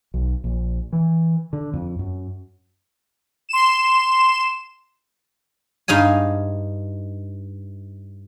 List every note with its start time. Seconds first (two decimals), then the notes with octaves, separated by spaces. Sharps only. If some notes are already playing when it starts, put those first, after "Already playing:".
0.14 B1
0.44 A#1
0.93 E3
1.53 D3
1.73 F2
1.99 F#2
3.49 C6 E7
5.88 G2 D#4 F5 G#5